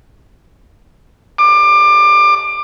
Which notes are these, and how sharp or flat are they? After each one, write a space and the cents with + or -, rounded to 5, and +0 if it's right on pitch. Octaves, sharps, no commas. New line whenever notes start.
D6 +25